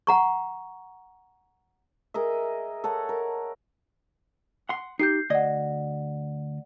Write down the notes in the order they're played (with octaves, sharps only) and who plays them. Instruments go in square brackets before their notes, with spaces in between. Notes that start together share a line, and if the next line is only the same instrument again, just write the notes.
[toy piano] F#5 A#5 C#6
[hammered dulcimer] G#4 A#4 D#5 E5
A4 C#5 F#5
A#4
[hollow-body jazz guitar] F#5 C6
[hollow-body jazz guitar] D#4 G4 [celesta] G6 C7
[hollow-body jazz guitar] D2 D#5 [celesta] D5 F#5